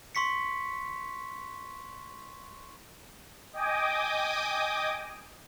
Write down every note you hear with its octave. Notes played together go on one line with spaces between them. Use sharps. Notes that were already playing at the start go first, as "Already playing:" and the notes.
C6 C#6 B6 C#7
D#5 G5 G#5 D6 D#6